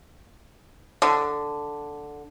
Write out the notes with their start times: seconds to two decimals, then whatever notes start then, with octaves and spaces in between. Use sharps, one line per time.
1.02 D3